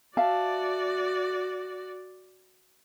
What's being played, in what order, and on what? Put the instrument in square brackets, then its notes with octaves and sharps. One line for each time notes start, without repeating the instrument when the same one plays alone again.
[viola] F#4 D5 [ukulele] E5 F5 A5